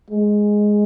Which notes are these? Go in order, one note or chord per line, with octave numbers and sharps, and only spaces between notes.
G#3